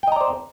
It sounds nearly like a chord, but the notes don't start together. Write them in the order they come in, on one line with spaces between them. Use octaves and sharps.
G5 D#5 A#5 D5 C5